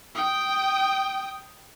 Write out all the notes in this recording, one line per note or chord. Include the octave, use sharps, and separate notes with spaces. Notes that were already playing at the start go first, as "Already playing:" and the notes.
G5 D#6